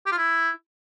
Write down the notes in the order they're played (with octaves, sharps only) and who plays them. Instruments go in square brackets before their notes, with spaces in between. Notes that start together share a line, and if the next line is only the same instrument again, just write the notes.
[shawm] G4
F4
E4